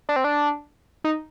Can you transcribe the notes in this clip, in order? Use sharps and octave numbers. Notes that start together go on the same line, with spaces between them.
D4
C4
D4
D#4